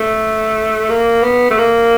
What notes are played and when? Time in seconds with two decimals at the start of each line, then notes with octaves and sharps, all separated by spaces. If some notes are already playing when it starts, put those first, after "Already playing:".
Already playing: A3
0.89 A#3
1.23 B3
1.51 A3
1.58 A#3